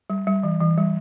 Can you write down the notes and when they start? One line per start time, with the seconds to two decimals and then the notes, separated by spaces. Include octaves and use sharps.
0.10 G3
0.27 G3
0.43 E3
0.61 E3
0.77 G3